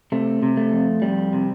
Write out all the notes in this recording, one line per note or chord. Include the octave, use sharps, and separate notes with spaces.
C3 A3
C3
A3
F2
F2 G3
C3